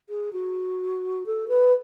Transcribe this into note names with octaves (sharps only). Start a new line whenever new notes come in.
G#4
F#4
A4
B4